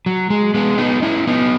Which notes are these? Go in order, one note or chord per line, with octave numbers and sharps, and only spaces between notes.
F#3
G#3
G#3 B3
B3 D#4
C#4 E4
B3 D#4